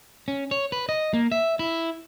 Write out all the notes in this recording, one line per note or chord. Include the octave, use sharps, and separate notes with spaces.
C#4
C#5
B4
D#5
A#3
E5
E4